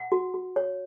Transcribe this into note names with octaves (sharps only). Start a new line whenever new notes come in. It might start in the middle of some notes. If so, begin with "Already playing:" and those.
Already playing: F#5
F#4
F#4
C#5